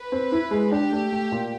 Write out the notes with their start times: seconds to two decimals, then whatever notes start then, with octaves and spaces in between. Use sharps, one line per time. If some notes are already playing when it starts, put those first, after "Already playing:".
Already playing: B4
0.12 C4
0.32 E4
0.51 G#3
0.71 D4 G4
0.92 A3
1.12 A3
1.32 A#2